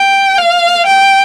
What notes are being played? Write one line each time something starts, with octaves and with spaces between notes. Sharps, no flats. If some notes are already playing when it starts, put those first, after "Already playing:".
Already playing: G5
F5
G5